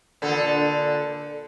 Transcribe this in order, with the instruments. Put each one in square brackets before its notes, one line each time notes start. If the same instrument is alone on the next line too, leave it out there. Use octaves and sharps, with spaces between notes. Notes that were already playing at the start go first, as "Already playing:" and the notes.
[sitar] A#2 D3 A4